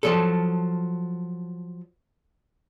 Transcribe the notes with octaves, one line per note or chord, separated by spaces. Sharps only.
F3 F#3 A4